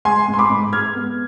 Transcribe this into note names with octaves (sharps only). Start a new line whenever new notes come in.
G#3 G#5 C6
G#2
C6
B5 D6
G#2
G#3 F6 G#6
B3